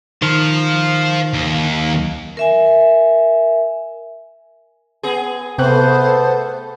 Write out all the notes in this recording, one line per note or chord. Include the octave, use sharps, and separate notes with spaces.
D#3 C5 F5
D#2
A#4 E5 G#5
B3 G#4
C3 A3 B3 A4 C5 G5 F#6